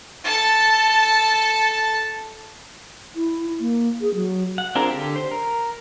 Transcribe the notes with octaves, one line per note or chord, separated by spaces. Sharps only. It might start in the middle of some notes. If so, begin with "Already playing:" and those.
A4 A5
E4
A#3
G#4
F#3
F#5
C4 D4 F4 G#4 A#4
D3 G4
C5
A#4